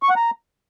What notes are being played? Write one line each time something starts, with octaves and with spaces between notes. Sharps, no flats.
C#6
F#5
A#5